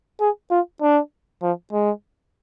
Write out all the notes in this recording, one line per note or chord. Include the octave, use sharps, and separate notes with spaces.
G#4
F4
D4
F3
G#3